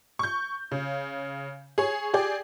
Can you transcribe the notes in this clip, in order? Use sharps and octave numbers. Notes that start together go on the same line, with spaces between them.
C#6 G6
C#3
G#4 C#5
G4 G#4 D5 G5